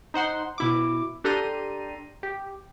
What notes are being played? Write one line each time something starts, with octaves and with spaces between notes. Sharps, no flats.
D#4 C5 F#5 C6
B2 E4 D6
D4 G4 A4 A#5 C6 D#7
G4